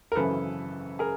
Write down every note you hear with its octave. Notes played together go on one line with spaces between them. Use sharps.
A#4
G#1 F#2 C#3 E3 A4 B4
G#4 A#4